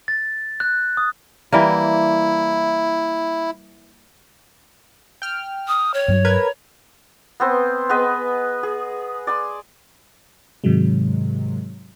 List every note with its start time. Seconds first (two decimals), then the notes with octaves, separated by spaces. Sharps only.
0.08 A6
0.60 F#6
0.97 D#6
1.52 E3 G3 A#3 E4
5.22 G5 F6
5.68 D#6
5.94 C#5
6.08 G2 F#3
6.25 A#4 B4 G#6
7.40 B3 C4 C5
7.89 B3 G#4 B4 D#5
8.63 G#4
9.27 D5 G#5 C6
10.64 G#2 C3 D#3 F#3 G#3